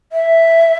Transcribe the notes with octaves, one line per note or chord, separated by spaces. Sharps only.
E5